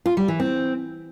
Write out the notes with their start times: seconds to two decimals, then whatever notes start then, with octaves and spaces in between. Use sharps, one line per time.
0.06 F4
0.17 G3
0.28 E3
0.40 C4